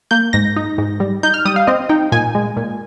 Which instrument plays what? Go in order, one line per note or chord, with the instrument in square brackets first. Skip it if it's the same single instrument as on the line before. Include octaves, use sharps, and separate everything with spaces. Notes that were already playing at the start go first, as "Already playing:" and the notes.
[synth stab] A#3 G6
G#2 A#6
D#4
G#2
G3
D#4 G6
F6
G3 D#6
F5
C4 D#5
D#4 G5
A#2 G#5
G#3
A#2